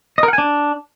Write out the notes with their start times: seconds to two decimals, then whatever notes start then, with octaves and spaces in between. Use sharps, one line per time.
0.18 D#5
0.23 A#4
0.28 F#5
0.33 G#5
0.38 D4